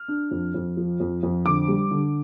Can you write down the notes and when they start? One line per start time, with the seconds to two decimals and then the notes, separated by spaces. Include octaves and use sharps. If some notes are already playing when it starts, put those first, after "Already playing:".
Already playing: F6
0.08 D4
0.31 F2
0.54 F2
0.77 F3
1.00 F2
1.23 F2
1.46 D3 D6
1.68 G3
1.91 D3